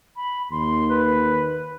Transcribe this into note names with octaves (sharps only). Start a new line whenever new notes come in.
B5
D#2 C6
B4